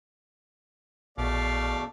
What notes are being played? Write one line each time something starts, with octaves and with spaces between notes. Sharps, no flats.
A#1 E2 B2 A3 D5 F5 D6